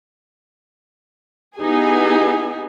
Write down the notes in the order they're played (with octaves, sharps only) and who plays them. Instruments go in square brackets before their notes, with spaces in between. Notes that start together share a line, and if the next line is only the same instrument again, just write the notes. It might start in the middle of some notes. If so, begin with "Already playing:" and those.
[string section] B3 D#4 E4 G4 G#4 G#5